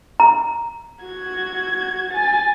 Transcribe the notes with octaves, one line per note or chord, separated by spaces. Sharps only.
A#5
F#4 G#6
G#5 A6